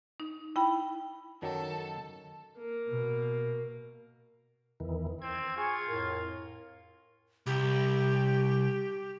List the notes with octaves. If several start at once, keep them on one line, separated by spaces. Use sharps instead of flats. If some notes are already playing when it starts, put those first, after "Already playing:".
D#4
E4 G5 B5
F#2 D#3 F#3 A4
A#3
B2
E2 D#3 E3
C4 G#6
F4 G#4 G#5 C#6
F2 A2 A#4
C2 G4